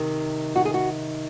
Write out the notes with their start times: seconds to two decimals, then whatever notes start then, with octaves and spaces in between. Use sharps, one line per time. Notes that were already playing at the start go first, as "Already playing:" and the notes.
Already playing: C3 D#3
0.56 F#4
0.65 G#4
0.74 F#4